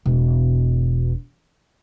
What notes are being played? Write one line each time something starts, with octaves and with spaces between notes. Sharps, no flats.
E1 B2